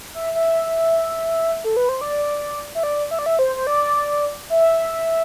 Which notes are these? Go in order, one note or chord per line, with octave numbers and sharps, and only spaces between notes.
E5
E5
A4
B4
C5
D5
E5
D5
E5
D5
E5
C5
C5
D5
E5